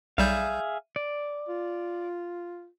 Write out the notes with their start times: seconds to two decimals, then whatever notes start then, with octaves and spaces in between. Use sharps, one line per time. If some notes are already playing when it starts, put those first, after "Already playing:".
0.18 B1 G3 G#4 E5 F5 G6
0.96 D5
1.49 F4